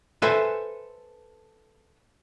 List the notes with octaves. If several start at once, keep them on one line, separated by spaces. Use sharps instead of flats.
A4 B4 C5 E5 G#5